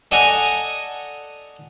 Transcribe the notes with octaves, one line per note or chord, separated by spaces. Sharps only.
A4 D5 D#5 F#5 G#5 A#5